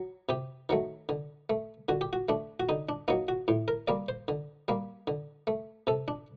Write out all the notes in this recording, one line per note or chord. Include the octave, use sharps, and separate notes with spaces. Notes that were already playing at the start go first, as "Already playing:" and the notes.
Already playing: F#3
C3 G4
D#3 F#3 A3
D3
A3
D3 F#4
G4
F#4
A3 D4
F#4
D3 D#4
D4
F#3 A#3 D#4
F#4
A2
A#4
G3 A#3 D5
C5
D3
G3 A#3
D3
A3
C3 A4
D4